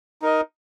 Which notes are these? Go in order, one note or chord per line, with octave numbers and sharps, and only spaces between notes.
D#4 A#4 D#5